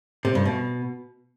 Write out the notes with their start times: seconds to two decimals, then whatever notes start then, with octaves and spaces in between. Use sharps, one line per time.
0.25 C3
0.35 G2
0.45 B2